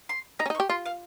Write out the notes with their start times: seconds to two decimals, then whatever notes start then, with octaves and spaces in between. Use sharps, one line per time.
0.09 C6
0.39 D#4 A#5
0.46 C#4
0.50 D#4
0.55 C#6
0.60 G4
0.69 F4 C6
0.85 F5